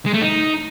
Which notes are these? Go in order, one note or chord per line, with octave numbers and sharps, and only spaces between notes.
G#3
A3
D#4